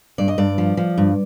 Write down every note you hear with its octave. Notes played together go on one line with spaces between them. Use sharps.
G2 D5
D#5
G2 D5
F3
F3
G2